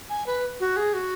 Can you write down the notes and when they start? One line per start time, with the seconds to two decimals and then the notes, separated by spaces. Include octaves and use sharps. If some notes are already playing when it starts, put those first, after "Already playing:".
0.10 G#5
0.26 B4
0.60 F#4
0.77 G#4
0.94 F#4